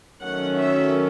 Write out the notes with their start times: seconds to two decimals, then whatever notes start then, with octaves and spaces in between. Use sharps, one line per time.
0.22 D#3 F#3 A3 C#4 F#5
0.59 E5